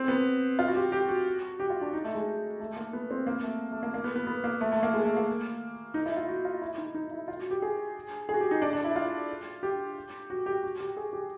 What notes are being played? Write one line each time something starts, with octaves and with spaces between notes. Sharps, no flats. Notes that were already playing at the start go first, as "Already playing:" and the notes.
Already playing: C4
B3
F4
F#4
G4
G4
F#4
G4
F4
D4
D#4
A3
G#3
A3
A#3
B3
C4
A#3
A3
A3
A#3
A#3
B3
B3
B3
A#3
A3
A3
A#3
G#3
A3
A#3
D#4
E4
F4
F#4
F4
E4
D#4
D#4
E4
F4
F#4
G4
G#4
G#4
F#4
G4
D#4
D4
D4
E4
F4
G4
F#4
G4
F#4
G4
G#4
G4